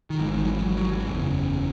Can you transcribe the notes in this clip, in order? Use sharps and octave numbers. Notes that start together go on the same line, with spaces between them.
D#3
G#1 G#2 E3
D#3
F#3
E3
F#3
F#3
E3
F#1 E2 C#3